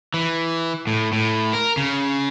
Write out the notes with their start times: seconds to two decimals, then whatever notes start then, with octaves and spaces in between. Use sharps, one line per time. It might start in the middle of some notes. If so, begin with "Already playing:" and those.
0.14 E3
0.87 A2
1.13 A2
1.53 A#4
1.77 C#3